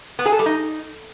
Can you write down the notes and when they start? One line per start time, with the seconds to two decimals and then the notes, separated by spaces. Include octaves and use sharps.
0.19 B3
0.26 G#4
0.32 A4
0.39 G3
0.46 D#4